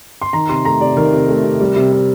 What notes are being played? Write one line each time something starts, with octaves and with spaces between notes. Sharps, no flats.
C6
D#3 A#5
C3 C6
A3 A#5
C3 D5
D#3 A#4
C3
A3
C3
G3
C3
C3